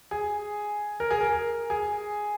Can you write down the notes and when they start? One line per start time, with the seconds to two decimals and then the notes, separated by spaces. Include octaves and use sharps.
0.11 G#4
1.00 A#4
1.11 G#4
1.21 A#4
1.70 G#4